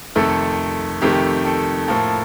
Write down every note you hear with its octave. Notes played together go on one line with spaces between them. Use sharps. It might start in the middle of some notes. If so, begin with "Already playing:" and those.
F2 C3 D#3 A3 A4
F2 C3 D#3 A3 G4
A4
A2 F3 A#3 A4